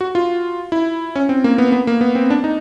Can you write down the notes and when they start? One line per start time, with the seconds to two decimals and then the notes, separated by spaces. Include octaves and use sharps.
0.01 F#4
0.15 F4
0.72 E4
1.16 C#4
1.29 C4
1.44 A#3
1.58 B3
1.72 B3
1.87 A#3
2.01 B3
2.15 C4
2.30 D4
2.44 D#4